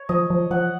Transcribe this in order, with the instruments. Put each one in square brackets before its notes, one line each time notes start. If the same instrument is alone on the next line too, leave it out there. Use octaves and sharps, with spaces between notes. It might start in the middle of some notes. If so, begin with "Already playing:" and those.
Already playing: [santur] C#5
[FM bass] F3 [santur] D#5
[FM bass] F3
[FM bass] F3 [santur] F#5